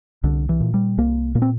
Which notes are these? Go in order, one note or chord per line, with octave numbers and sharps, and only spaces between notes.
C2 D3
E3
A#2
G3
C2 A#3
A#2 A#3
C4